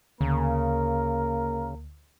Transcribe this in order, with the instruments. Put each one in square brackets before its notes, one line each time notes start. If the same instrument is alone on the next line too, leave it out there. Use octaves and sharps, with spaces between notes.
[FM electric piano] D2 [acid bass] C#3 [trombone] A#3 [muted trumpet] A#4